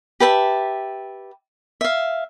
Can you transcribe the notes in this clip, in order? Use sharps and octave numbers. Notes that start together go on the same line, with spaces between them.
G4 B4 E5 A5
E5 F5